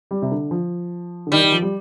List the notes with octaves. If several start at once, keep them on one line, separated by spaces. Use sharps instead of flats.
G3
C3
D3
F3
D3
D#3 G3
D#3
F3
G3